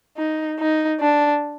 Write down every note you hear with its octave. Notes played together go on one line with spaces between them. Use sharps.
D#4
D#4
D4